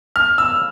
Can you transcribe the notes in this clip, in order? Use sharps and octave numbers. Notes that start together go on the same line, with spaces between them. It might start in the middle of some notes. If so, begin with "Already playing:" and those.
F6
E6